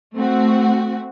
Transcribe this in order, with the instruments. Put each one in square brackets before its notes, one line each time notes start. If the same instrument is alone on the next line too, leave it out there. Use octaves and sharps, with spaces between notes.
[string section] A3 C4 F#4